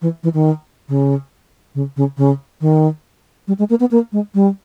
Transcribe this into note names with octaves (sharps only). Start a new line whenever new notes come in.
E3
E3
D#3
C#3
C#3
C#3
C#3
D#3
G3
G#3
A#3
B3
A#3
G#3
G3